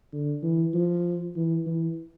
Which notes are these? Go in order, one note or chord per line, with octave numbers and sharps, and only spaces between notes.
D3
E3
F3
E3
E3